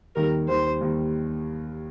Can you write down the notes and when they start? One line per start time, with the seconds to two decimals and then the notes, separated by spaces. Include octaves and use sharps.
0.16 D#2 D#3 G3 A#4
0.48 D#2 D#3 G3 C5
0.81 D#2 D#3 G3